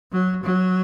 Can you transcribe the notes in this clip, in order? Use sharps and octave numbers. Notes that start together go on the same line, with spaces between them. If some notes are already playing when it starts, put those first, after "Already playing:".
F#3
F#3